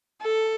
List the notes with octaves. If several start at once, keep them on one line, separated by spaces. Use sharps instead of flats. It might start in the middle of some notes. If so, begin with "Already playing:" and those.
A4